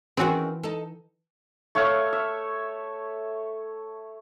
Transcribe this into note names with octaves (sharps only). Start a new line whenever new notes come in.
D#3 E3 C4 C#4 F#4 G#4
D#4 A4
A3 C#5 E5 F5
E5